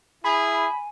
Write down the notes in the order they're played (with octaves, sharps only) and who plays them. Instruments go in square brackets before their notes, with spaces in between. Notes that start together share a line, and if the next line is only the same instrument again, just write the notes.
[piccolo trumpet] E4 [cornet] G#4 [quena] G#5 [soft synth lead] B5